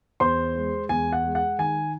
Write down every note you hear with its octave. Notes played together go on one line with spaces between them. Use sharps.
E2 C5 C6
G#3
E2 G#5
F#5
G#3
F#5
D#3 G#5